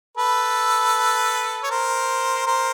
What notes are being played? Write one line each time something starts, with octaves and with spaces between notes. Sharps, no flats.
A4 B4
C#5
A#4 C5
A#4 C5